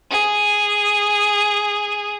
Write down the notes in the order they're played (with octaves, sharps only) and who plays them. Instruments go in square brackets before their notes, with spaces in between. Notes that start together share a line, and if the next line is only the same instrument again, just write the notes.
[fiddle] G#4